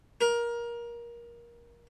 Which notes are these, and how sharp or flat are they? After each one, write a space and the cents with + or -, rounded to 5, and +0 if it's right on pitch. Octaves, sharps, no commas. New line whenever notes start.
A#4 +20